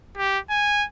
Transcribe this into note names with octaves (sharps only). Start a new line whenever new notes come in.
G4
G#5